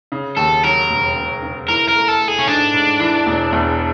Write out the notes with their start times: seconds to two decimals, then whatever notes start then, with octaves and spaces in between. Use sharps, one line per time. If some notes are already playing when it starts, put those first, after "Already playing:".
0.12 C#3
0.37 D#2 A4
0.64 F#3 A#4
0.90 E1
1.16 E1
1.42 C#3
1.69 E3 A#4
1.89 A#4
1.95 A3
2.08 A4
2.21 A3
2.28 G#4
2.39 C#4
2.47 G#2 D4
2.74 G#2
3.00 E3
3.26 E1
3.53 E2